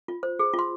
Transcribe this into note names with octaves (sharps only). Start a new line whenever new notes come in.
F4
C5
G#4
F4
C6